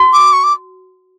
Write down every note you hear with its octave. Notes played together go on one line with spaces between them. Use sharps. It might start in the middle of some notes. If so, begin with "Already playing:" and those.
Already playing: F#4
D6
C#6
D6